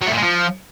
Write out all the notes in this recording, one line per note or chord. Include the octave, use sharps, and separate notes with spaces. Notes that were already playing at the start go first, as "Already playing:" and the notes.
F#3
A3
A#2
G#3
F3